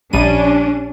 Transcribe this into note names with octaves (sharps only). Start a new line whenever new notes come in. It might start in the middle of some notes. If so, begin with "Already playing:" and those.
A#1 G3 C#4 D4 D#7